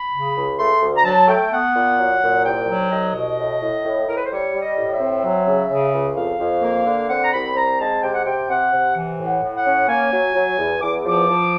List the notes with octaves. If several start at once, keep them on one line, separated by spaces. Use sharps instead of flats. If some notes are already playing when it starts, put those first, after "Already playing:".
Already playing: B5
C#3
C#2
A3 C6
D2
A#5
F#3 A5
A3 G5
B3 F#5
A#2
F#3
A#2
C2 G5
F#3
C2 D#5
B2
A2
A2
A2
A2 A#4
B4
C5
G3 C#5
G3
D#5
A2
E5
C4
F#3
C#3
C#3
C#2
F2 F5
F2
A#3
D3
C4 F#5
A#5
C2 B5
C4 A#5
G#3 A5
C3 G5
F#5
C3 G5
C3 F#5
C3
E3
A2
F#5
A2
F#5
C#4
A#3 G#5
F#3
F#3
E2
E2 D6
F3 D6
F3